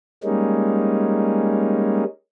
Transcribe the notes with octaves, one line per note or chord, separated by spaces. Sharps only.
G3 G#3 A#3 C#4 D#4